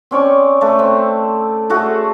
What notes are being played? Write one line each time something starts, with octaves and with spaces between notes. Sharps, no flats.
C4 C#4 D5 C#6
A3 A4 B4
C4
A3 F#4 G#4 A4